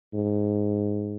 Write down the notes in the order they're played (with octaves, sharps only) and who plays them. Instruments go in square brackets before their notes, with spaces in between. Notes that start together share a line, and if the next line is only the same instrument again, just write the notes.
[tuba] G#2